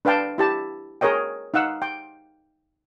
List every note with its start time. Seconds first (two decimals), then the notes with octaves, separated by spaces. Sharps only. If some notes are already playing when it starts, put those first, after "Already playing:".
0.05 D4 B4 F5 G5 A5
0.38 E4 G4 A5
1.01 G#4 A#4 C#5 D#5 G5
1.54 D#4 F5 F#5 E6
1.82 G5